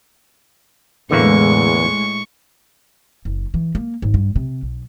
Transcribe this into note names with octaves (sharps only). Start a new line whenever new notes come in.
E2 A2 D3 E3 G#3 A#3 C#6
F#1
E3
A#3
G#1
G2
C3
B1